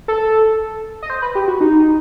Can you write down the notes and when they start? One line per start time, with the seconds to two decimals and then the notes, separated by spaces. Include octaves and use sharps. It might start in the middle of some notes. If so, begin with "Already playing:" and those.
0.08 A4
1.02 D#5
1.10 C5
1.22 B4
1.35 G4
1.48 F#4
1.61 D#4